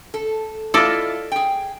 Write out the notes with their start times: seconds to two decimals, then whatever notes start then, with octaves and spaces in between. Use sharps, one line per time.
0.14 A4
0.74 E4 F4 A4 D5 D#5
1.32 G#4 G5